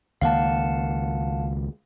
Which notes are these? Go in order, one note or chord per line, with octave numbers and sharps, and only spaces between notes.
C#2 D#3 A#3 F5 F#5 A5